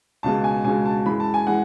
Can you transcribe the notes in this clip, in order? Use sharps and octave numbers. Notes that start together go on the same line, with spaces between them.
C#2 B2 G#3 A5
G#5
C#2 B2 G#3 G#5
A5
F#2 E3 G#3 B5
A5
G#5
E3 G#3 F#5